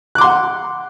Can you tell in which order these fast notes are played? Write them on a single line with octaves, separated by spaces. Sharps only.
F#6 D6 C6 F#5